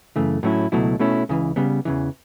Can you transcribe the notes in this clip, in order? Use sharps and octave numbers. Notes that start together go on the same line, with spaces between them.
F#2 C#3 E3 A3
A2 F#3 A3 C#4 E4
C#2 B2 F#3 A3 E4
B2 A3 C#4 E4
C#2 C#3 E3
C#3 G3 B3
E2 C#3 E3